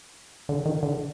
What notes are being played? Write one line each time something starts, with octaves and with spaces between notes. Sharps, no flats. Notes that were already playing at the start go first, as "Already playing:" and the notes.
D3
D#3
D3